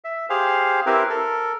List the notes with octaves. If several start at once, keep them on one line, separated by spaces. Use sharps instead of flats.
E5
G4 G#4 C5 F5
C4 E4 G4 A#4 B4
A4 A#4